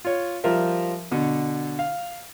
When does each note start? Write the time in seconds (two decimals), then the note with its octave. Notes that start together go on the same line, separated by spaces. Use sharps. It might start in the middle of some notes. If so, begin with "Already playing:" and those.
0.05 F4 C#5
0.44 F3 G3 F4 A#4 E5
1.11 B2 D3
1.79 F5